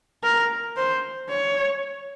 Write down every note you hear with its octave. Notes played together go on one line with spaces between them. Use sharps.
A#4
C5
C#5